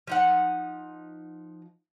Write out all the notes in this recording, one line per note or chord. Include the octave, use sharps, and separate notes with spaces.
F3 D#4 F#5